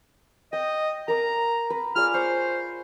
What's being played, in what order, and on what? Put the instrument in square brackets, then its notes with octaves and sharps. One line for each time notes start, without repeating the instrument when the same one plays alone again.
[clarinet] D#5 [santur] G5
[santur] A#4 D6 [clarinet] A#5
[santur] B4
[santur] F4 G#4 D5 [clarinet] F6
[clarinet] C5 [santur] C#6